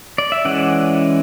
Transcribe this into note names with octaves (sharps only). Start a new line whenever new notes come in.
D5
E5
E3 G#3 C#4 D5 F#5